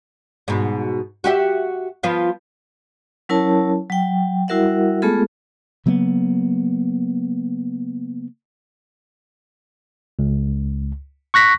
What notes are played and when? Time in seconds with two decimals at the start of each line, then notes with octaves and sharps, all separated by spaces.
0.48 G#2 B2
1.24 F#4 G4 E5
2.03 F3 B3 F4
3.29 F#3 C#4 E4 A#4 C#5 A5
3.90 F#3 G5
4.48 G3 E4 F#4 A#4 E5 F#5
5.02 G#3 A3 B3 F4 G#4 A4
5.86 C#3 F#3 A#3 B3
10.19 C#2
11.34 C#6 F#6 A#6 B6